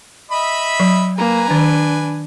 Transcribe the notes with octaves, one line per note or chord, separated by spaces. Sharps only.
D#5 E5 B5
F#3
A#3 B4 G#5 A#5
D#3 D4